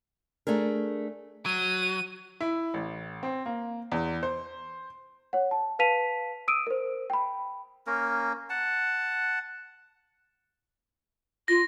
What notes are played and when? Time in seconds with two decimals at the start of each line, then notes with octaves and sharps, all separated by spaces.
0.47 A3 D4 G#4 A#4
1.46 F#3 D#7
2.41 E4
2.74 A1
3.23 C4
3.46 A#3
3.92 E2
4.23 C5
5.33 C#5 F#5
5.51 A5
5.79 B4 F5 A5 B6 D#7 F7
6.48 D#6 E6 D7 D#7
6.67 A#4 C5
7.10 G5 B5
7.87 A#3 C#4 A#4
8.50 F#5 A5
11.48 F4 A#6